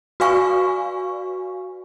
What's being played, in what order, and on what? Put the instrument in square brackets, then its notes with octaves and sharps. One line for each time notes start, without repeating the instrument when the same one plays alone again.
[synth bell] F#4 B4 D5 F5 G#5 C#6